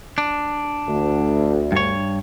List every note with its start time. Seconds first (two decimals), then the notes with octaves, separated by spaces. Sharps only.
0.18 D4
0.87 D2
1.72 G2 C#5